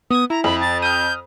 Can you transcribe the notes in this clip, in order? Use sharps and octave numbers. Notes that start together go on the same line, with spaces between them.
B3 D#6 G#6
E4 A#5
F2 B5
A6
D#6 F6 G6